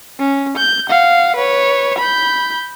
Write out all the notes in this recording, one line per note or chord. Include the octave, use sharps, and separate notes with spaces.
C#4
G6
F5 F#5
B4 C#5
B5 G6